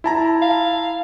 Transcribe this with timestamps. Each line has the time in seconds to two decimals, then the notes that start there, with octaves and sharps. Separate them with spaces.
0.04 E4 A5 A#5
0.42 F5